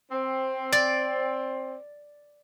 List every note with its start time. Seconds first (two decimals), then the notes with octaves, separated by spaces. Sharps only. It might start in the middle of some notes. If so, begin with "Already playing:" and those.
0.11 C4
0.72 D5